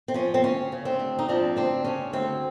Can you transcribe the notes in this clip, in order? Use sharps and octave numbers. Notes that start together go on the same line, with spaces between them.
C4
F3 C#4
C4
D2 C#4
C#3
C4 D4
D2
D#4
F3 C4 D4
D2 C4 D4
C#3 C#4
D2 C4